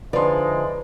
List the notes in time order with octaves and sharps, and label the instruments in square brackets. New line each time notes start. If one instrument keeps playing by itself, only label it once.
[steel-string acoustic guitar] D3 F3 [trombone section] G#3 D#4 E4 [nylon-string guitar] B4 [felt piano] D5 C6